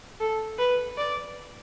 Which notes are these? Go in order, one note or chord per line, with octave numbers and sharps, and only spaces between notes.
A4
B4
D5